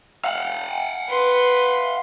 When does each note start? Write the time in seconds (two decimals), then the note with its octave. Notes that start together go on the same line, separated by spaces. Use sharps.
0.24 F5 F#5
1.09 B4 C6